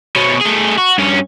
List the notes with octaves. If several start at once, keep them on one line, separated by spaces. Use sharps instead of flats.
B2 C#4
A3 G#4
F#4
G2 C#4